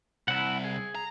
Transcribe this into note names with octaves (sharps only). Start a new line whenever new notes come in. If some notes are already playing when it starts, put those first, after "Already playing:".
C2 E4 F#5
G#4
A#5